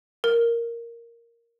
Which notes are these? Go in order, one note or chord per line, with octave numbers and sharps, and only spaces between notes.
A#4